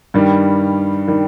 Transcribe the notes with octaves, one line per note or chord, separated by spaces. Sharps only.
G2 D#3 G3
D#3 G3